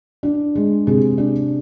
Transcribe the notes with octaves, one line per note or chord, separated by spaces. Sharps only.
D4
G#3
C3 G#4
D4